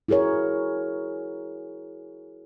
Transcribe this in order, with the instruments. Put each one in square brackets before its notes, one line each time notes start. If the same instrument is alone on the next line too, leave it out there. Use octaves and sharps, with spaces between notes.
[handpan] E4 F#4 G#4 A#4 C#5